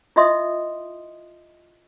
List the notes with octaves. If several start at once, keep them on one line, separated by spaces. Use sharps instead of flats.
E4 F4 D#5 E5 C6 D#6